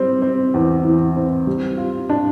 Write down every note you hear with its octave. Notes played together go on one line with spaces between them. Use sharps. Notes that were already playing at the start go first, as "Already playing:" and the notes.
Already playing: G3 C4
C4
E2
E3
C4
G3
F4
D4